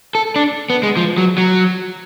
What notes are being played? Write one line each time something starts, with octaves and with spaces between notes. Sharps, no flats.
A4
D4
B3
G#3
F3
F#3
F#3